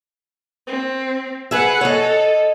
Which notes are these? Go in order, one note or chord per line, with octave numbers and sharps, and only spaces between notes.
C4
G#4 B4 E5 F#5
A4 C#5 D#5